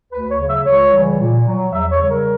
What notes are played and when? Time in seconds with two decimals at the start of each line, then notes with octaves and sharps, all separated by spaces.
0.12 D2 B4
0.30 C#5
0.39 C#3 F#3
0.48 E5
0.66 C#2 C#5
0.93 C#3 E3 G3
1.20 A#2
1.47 F#3
1.73 E2 E5
1.91 C#5
2.00 C#3 G3
2.10 A#4